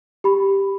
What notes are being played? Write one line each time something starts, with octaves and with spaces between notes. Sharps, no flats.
G4 B5